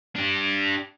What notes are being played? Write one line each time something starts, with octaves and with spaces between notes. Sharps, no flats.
D4 G4